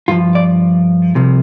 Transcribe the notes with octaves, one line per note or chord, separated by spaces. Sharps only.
G2 F3 F4
D5
C2 C3 F3